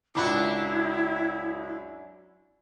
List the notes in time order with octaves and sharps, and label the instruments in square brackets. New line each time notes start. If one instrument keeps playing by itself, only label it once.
[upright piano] C#2 B5 D6 [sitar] F#2 D4 F#4 [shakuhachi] E4